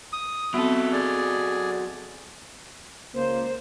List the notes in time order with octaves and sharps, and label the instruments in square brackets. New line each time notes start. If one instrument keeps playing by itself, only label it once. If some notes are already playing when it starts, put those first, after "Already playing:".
[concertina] D#6
[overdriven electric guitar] F#3 A4 [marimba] B3 C4 [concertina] E5
[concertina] G#4 D5
[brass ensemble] C#2 A#3 [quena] C5